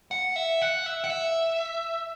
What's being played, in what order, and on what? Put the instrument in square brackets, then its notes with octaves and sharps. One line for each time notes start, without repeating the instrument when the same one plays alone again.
[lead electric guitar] F#5
E5
F#5
E5
F#5
E5